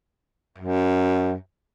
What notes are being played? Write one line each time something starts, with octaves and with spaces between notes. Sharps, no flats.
F#2